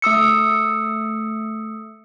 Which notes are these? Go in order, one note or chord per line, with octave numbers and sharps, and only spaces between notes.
A3 D#6 E6 C#7